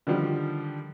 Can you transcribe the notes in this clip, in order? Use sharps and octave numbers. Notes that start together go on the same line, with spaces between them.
D3 D#3 F3 G3